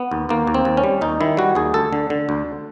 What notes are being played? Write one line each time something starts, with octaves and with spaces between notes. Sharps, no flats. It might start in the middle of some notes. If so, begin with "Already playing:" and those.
Already playing: B3
D#2
D#2 A#3
D#2
C4
D#2
C#4
G3
D#2 D#4
D#3 E4
G3 F#4
D#2 G#4
D2 A4
D3
D3
D2